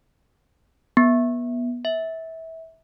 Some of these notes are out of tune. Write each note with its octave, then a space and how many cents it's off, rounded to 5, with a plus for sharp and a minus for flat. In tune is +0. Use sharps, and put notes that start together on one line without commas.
B3 -25
E5 -25